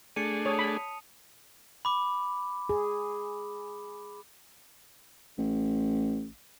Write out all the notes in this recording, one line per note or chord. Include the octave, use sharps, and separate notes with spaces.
A3 D4 G#4 C#7 D#7
C#5 A5 D#6 F7
B5
B5 D6
G#4
A1